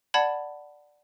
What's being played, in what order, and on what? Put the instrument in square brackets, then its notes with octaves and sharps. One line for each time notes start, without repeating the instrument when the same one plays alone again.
[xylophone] D5 F#5 A5 B5 G#6 F#7